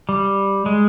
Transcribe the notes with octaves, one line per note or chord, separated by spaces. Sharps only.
G3
G#3